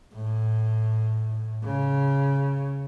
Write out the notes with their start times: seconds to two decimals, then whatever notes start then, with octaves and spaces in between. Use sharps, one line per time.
0.14 A2
1.64 C#3